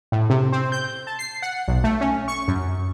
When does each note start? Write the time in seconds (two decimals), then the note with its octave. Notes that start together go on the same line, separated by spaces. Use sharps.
0.12 A2
0.30 C3
0.52 C4
0.72 G6
1.07 A5
1.19 C7
1.42 F#5
1.68 B1
1.84 A3
2.01 C#4
2.28 C#6
2.48 F#2